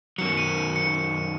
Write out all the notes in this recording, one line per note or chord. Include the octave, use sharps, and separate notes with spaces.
F#2 D#3 F#3 C#7
C#7
D#7
D#7
C#7
C#7